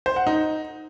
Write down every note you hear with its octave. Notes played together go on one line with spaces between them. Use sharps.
C5
F#5
D#4